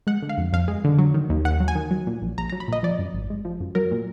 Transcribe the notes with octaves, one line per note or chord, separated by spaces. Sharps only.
G#3 F#5
D3
F5
F2
F2 F5
G#3
D3
F#3
D#3
D#2
D#2 F#5
F#3
G#5
D#3
F#3
A#2
A#1
A#1 A#5
F#3 A#5
B5
A#2 D#5
F3 D5
F#2
G#1
G#3
F3
F#2
F#3 A#4
A#2